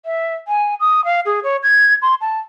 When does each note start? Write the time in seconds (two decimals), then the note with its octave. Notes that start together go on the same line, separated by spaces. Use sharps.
0.05 E5
0.48 G#5
0.80 D#6
1.05 F5
1.26 G#4
1.44 C#5
1.63 G#6
2.02 C6
2.21 A5